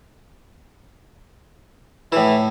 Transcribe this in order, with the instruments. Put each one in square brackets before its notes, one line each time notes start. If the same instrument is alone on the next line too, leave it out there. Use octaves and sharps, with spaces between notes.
[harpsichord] A2 E4 [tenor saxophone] E3